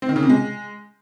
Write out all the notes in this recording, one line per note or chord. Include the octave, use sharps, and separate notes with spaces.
C4
D#3
C#3
C3
G#3